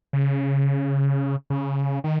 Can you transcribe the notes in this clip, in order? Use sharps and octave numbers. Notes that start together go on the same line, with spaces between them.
C#3
C#3
D#3